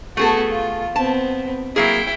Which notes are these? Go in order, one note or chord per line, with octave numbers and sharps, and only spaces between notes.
A3 B3 F#4 G#4 A4
F4
B3 C4 A5
F#3 A#3 E4 G#4 G5